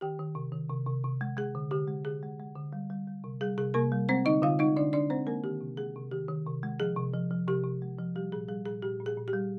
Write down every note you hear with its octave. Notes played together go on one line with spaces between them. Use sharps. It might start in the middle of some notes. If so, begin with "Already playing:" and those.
D#3 G4 G5
D#3
C3
D#3
C3
C3
C3
G#3
G#3 G#4
D3
D3 G4
G#3
D3 G#4
G#3
G#3
D3
G3
G3
G3
C3
G3 G#4
C3 G#4
C3 A#3 A#4
G3
G#3 C4 C5
D3 D#4 D#5
D3 F4 F5
G#3 D#4 D#5
D3 D4 D5
D3 D4 D5
G#3 C4 C5
G#3 A#3 A#4
D#3 G4
C3
G#3 G#4
C3
D#3 G4
D#3
C3
G#3
F3 G#4
C3
F3
F3
C3 G4
C3
G#3
F3
G3 G4
A#2 G#4
G3 G#4
A#2 G#4
A#2 G4
A#2
G#4
A#2
G4
G3